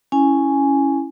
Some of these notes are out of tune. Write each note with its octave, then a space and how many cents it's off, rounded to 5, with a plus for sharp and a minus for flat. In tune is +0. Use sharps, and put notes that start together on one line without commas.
C#4 +0 E4 +0 G#5 +0